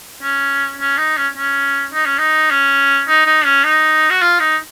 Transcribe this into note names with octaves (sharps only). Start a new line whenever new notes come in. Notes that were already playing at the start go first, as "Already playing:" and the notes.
C#4
C#4
D#4
C#4
C#4
D#4
C#4
D#4
C#4
D#4
D#4
C#4
D#4
F#4
F4
D#4